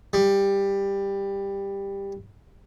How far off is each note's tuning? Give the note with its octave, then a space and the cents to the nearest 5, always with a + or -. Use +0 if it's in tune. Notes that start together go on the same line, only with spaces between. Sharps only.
G3 +15